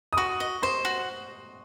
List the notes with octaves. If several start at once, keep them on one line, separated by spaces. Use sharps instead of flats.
D#6
F#4 C#6
D#5
C5 C6
F#4